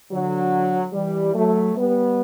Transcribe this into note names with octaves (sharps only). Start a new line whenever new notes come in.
D3 F#3
E3 G3
F#3 A3
G3 B3